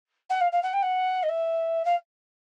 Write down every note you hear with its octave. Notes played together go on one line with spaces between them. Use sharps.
F#5
F5
F5
F#5
G5
F#5
D#5
E5
F5